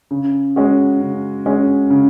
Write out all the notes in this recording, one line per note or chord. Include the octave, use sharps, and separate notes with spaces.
C#3
G#3 C#4 F#4
C#3
G#3 C#4 F#4
C#3